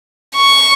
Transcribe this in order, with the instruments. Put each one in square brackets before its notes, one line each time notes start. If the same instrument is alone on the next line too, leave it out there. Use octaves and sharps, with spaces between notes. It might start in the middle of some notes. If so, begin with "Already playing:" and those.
[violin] C#6